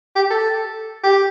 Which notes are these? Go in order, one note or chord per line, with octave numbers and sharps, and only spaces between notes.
G4
A4
G4